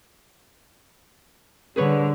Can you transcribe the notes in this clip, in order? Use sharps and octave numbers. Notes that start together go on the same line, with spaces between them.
D3 G3 G#4 B4 C#5